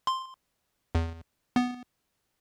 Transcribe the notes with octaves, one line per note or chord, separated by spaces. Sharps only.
C6
E2
B3